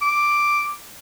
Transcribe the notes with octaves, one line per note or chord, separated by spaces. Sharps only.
D6